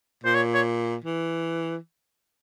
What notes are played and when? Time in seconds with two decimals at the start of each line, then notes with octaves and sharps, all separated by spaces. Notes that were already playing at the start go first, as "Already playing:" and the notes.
0.24 A#2 C5
0.35 C#5
0.54 C#5
1.05 E3